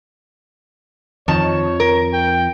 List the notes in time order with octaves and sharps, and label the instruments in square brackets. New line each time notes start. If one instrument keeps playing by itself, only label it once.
[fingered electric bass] F2 F3 [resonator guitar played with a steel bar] D#3 A5 [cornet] C#5
[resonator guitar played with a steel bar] A#4
[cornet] G5